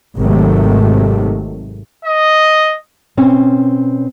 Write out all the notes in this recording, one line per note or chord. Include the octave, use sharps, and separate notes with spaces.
G#1 G#2 C3 D#3 F#3 A3
D#5
B2 C4 C#4 C#5